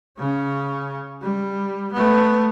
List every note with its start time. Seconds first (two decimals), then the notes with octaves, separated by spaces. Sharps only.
0.18 C#3 C#4
1.22 G3
1.93 A3 B3